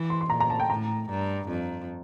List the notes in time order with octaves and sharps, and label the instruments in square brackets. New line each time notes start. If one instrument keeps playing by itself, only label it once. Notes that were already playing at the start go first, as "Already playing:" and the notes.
Already playing: [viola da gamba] E3
[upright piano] C6
C6
[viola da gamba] A#2 [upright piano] A#5
[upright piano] A#5
A5
G5
[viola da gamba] A2 [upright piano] A#5
[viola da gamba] G2
F2